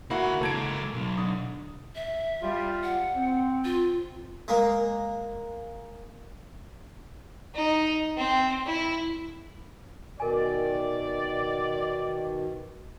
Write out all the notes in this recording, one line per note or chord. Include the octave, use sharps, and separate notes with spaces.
D3 A#3 E4 F#4 B5
C#2 A#3 A4 G#6 D7
B1
D3 D#6
E5
G3 F4
F#5
C4
F4
G#3 A#3
D#4
C4
E4
B2 D#3 A#4 D5 G#5